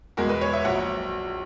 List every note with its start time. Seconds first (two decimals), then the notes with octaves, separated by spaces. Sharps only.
0.17 E2 B2 G#3 A#4
0.29 B4
0.41 C#5
0.53 E5
0.65 A#1 F#3 F#5